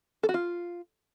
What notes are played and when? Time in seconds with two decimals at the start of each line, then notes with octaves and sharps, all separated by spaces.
0.23 A4
0.29 F#4
0.34 F4